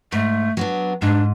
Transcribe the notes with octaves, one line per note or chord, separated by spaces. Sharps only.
G#2 A3
F#3 B3 D4
G#2 D4